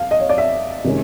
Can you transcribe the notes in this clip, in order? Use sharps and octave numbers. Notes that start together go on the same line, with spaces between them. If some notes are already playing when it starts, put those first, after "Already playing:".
Already playing: F5
D#5
C#5
D5
E5
C3 D#3 G#3 C#4